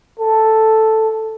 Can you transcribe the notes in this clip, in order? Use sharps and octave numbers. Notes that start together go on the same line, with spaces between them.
A4